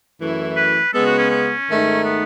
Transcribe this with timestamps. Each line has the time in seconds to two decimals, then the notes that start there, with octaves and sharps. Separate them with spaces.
0.19 F#2 E3 A3 E4
0.57 B4
0.93 C#3 G#3 B3 A4
1.06 F#4
1.18 C#4
1.30 C#4
1.68 G#2 D#3 A3 D#4
2.04 B3